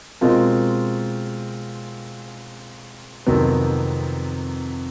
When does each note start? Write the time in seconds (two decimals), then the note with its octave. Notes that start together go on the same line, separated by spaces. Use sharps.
0.21 B2 G#3 C4 F4 A#4
3.26 F2 C3 D#3 F#3 B3